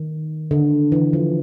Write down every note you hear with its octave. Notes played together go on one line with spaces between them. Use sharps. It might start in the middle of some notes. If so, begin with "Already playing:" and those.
Already playing: D#3
D3
E3
F3